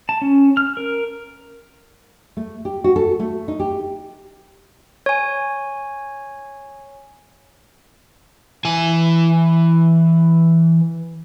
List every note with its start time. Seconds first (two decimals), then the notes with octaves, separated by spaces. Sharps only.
0.09 A5
0.22 C#4
0.57 F6
0.77 A#4
2.37 A3
2.65 G4
2.84 F#4
2.96 A4
3.20 A3
3.48 D#4
3.60 G4
5.06 C#5 G#5
8.65 E3 G#5